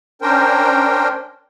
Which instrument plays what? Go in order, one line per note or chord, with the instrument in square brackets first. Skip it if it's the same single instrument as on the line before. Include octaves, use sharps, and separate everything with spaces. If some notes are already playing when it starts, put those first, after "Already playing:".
[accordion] C#4 D4 A#4 C5 G5